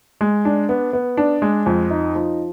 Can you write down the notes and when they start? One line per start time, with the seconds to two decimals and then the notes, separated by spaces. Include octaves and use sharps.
0.21 G#3
0.45 D4
0.69 B3
0.93 B3
1.17 D4
1.42 G#3
1.66 F2
1.90 D#4
2.15 F3